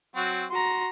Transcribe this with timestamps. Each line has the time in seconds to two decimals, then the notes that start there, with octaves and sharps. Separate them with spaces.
0.16 F#3 C4 F#4
0.51 F#4 A#5 C6